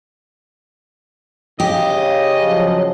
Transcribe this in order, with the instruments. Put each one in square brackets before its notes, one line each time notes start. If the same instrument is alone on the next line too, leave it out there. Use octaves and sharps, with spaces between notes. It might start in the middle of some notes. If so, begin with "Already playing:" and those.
[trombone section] C#3 [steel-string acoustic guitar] G4 [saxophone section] D#5
[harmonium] F3 F#3